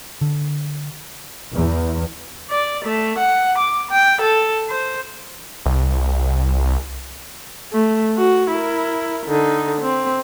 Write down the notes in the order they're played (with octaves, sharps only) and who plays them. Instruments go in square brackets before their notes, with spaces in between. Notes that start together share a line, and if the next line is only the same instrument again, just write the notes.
[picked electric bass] D3
[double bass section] E2
[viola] D5
A3
F#5
D6
G5
A4
C5
[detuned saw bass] C2
[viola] A3
F#4
E4 A#4
D3 D#4
C4